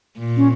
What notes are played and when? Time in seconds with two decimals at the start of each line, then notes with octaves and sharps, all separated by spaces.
0.18 A#2
0.37 C#4